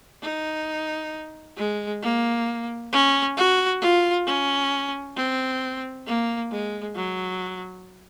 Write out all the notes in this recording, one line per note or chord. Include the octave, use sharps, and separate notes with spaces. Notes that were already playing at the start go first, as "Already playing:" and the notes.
D#4
G#3
A#3
C#4
F#4
F4
C#4
C4
A#3
G#3
F#3